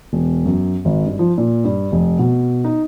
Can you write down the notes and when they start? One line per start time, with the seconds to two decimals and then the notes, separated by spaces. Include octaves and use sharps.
0.13 E1
0.45 F#2
0.85 G#1
1.06 G2
1.19 F3
1.38 A#2
1.64 G2
1.92 F1
2.19 B2
2.65 D#4